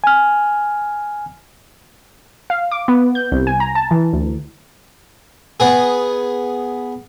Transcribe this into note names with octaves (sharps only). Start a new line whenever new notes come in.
G#5 F6
F5
D6
B3
G6
C2
G#5
A#5
A5
E3
D2
B3 G#4